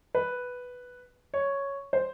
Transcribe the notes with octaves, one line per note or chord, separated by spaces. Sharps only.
B4
C#5
C5